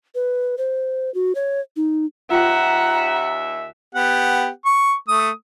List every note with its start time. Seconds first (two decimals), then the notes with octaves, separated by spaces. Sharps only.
0.15 B4
0.58 C5
1.14 F#4
1.35 C#5
1.76 D#4
2.31 D#2 F4 E5 F#5 G5 A#5
3.95 B3 G4 F#5
4.65 C#6
5.08 A3 D#6